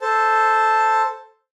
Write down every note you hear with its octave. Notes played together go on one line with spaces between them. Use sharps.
A4 C5 A5